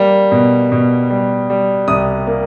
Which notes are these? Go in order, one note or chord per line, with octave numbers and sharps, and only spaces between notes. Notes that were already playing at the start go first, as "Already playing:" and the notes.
Already playing: G3 A#3
B2
B2
G3
G3
C2 D#6
A#3